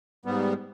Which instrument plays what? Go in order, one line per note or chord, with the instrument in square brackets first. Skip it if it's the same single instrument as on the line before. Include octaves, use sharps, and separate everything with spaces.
[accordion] G#2 G3 B3